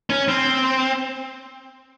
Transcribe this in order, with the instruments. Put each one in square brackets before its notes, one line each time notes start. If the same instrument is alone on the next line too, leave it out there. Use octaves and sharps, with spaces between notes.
[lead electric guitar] C#4
C4